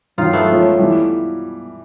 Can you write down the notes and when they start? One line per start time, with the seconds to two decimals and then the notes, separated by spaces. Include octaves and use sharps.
0.18 G2 D#3 F#3 D#4 F4
0.33 A3 B3
0.48 F3 G#3 C#4
0.79 E3 G3